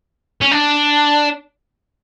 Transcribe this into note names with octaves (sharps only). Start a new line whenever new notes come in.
C#4
D4